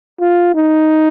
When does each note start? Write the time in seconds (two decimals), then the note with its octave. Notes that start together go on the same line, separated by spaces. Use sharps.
0.21 F4
0.55 D#4